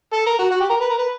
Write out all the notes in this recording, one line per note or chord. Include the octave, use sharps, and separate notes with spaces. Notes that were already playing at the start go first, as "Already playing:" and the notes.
A4
A#4
F#4
F#4
G4
A#4
B4
A#4
B4